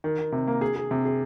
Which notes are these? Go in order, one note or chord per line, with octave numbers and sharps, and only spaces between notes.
D#3
D#3
C3
A#3
G#4
G#4
C3
G#4